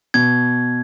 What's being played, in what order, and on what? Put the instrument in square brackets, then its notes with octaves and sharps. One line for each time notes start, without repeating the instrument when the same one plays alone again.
[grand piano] B2 [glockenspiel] G#6